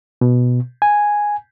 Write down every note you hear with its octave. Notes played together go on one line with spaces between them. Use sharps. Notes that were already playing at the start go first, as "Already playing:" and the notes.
B2
G#5